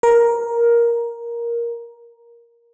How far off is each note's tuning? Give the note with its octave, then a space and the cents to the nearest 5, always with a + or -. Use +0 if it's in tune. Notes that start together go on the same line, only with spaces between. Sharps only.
A#4 +10